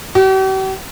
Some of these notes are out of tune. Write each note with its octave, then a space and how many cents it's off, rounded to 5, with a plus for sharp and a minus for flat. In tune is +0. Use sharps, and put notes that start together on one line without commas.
G4 -45